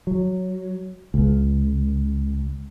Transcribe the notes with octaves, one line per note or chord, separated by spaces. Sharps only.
F#3
C#2